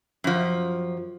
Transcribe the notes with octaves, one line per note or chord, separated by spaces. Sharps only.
F#2 F3